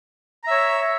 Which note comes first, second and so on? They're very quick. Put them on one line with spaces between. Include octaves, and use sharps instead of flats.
A#5 E5 C#5